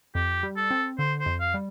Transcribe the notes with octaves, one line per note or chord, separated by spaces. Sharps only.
F2 G4
G3
A4
C4
D3 C5
C5
F2
F5
G3